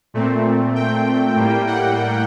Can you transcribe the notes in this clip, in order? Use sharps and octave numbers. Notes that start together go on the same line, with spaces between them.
A#2 A3 C4
G5
A2 G3 A#3
F#5